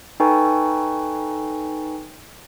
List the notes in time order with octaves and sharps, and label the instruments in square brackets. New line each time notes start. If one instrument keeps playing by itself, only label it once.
[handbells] D#4 A4 B4 G5 G#5 C#6